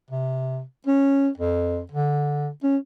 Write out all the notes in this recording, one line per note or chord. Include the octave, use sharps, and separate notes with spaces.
C3
C#4
F2
D3
C#4